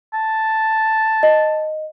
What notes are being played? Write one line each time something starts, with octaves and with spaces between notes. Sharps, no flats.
A5
D#5